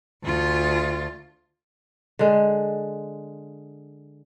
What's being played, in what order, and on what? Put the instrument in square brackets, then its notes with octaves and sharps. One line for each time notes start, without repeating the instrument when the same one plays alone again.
[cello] D2 F4
[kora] D3 G#3